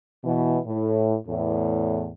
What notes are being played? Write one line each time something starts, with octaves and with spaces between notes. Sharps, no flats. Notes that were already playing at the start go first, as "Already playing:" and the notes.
B2 E3
A2
E2 A2